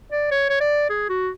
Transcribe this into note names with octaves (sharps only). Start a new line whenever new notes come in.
D5
C#5
C#5
D5
G#4
F#4